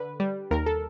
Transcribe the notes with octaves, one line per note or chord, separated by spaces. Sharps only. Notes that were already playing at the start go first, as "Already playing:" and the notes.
Already playing: D3 B4
G3
D#2 A#4
A4